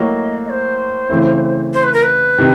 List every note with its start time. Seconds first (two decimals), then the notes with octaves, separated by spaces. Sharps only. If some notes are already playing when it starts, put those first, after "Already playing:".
Already playing: A2 F#3 A#3 D#5
0.45 D#5
0.50 C5
1.09 C#3 E3 A3 C4 E4
1.73 C5
1.83 B4
1.93 A#4
2.03 B4
2.38 C3 D#3